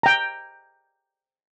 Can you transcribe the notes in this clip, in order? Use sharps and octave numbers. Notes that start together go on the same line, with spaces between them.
G5 A#5